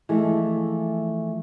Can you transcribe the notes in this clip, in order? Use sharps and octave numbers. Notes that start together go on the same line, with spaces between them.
E3 F3 G#3 A3